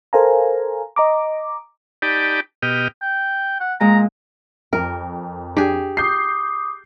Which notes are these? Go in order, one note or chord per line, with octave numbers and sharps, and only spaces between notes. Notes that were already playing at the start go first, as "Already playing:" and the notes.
A4 A#4 C5 F5 G#5 A#5
D#5 A#5 D6
D#4 G4 D5 G5 A5 B5
B2 G4 D#5 G5 F6
G5
F#5
A#2 G#3 A#5
F2 A#4
D4 G4 G#4
D6 D#6 G6 C7